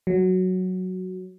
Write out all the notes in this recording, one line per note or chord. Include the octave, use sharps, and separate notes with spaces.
F#3